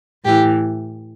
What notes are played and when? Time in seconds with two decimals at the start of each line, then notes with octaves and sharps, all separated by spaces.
0.24 A2 E3 G4